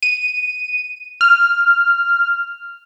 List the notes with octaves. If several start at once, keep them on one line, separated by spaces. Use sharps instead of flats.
D#7
F6